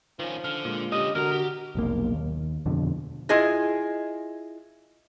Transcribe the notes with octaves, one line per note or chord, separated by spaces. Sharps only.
D#3 F3 C#4
D3 F6
A#2 G#3
D3 C#4 G4 D#5
E2 D3 F#4 A#4 A#5
G4
F1 B1 A#3
D#2
F2 B2 D3
E4 F4 G#4 D#5